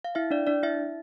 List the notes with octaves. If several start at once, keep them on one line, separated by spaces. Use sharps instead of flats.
F5
E4 E5
D4 D5
D4 D5
E4 E5